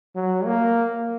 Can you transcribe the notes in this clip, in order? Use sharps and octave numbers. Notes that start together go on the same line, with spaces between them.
F#3
A#3